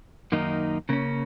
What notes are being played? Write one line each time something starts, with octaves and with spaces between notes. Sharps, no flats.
F#2 D#3 A#3 D#4
C#3 A#3 C#4